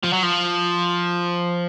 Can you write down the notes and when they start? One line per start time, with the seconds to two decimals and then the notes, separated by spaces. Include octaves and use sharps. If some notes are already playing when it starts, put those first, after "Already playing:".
0.04 F3
0.13 F#3
0.23 F3